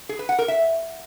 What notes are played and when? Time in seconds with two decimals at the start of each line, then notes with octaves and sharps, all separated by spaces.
0.09 G#4
0.19 B4
0.29 F#5
0.39 A#4
0.48 E5